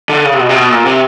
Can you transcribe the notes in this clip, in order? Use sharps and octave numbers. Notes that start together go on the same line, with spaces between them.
D3
C#3
C3
B2
C3
B2
A#2
C3